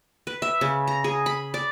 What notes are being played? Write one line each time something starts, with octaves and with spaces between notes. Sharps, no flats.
B4
E5
C#3
A#5
G#4
B5
D5